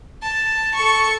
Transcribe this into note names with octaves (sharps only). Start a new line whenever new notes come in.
A5
A4 C#6